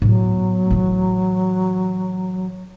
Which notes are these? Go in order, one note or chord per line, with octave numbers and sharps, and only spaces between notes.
A2 F#3 B3
A2 E3